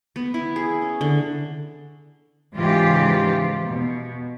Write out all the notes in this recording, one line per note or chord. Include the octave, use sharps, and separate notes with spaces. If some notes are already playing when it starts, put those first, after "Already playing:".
B3
E4
G#4
C#4
D3
G#2 C#3 E3 F3 F4 G4
B2